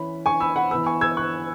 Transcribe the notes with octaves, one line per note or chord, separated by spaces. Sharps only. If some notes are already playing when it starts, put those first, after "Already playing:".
Already playing: E3 C#4 B5
G#5 C#6
B5 E6
F#5 B5
E3 B3 B5 E6
G#5 C#6
E6 G#6
C#6 F#6